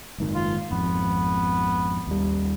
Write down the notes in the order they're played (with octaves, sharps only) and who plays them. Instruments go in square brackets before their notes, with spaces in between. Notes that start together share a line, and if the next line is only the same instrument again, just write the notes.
[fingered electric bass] F#1 G#2 D#3
[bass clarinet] F4
[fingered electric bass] G#1 F2 [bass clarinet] B3
[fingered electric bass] D#2 G3